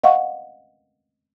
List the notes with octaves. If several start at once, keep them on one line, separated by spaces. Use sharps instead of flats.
D#5 F5 F#5 C#6